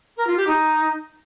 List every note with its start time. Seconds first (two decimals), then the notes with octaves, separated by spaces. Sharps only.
0.16 A#4
0.26 F4
0.36 G4
0.47 D#4